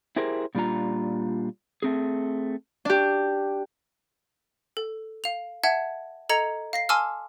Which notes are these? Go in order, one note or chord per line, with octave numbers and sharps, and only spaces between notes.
E4 G4 G#4 A#4 C5
A#2 G3 D4 F4 A#5
A3 C4 G#4
D4 G4
A4
F5 F7
E5 F#5 A5 G#6
A4 D#5 A#5 G#6 C#7 F7
F5 A#6 C7
G#5 A5 C6 D6 E6 F6